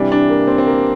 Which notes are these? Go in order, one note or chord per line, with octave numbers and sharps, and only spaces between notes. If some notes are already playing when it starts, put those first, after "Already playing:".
Already playing: C3 E3 G3 D4
D4
A#3
C4
C4
A#3